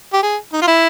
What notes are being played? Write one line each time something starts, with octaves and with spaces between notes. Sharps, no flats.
G4
G#4
D#4
F4
E4